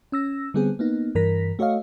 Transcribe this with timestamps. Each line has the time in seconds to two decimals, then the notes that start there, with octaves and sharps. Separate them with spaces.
0.12 C#4 E6 A#6
0.54 D3 G3 B3 C4 G#4
0.79 A#3 B3 D#4
1.15 G2 E3 A#4 A#6 B6
1.59 A3 F#4 C#5 D#5 F5